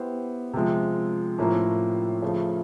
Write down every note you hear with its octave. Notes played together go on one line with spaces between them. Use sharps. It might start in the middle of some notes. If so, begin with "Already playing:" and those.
Already playing: B3 E4 G4 C5
C3 F3 G#3
A2 F3 A#3 C#4 E4
C#3 F3 A3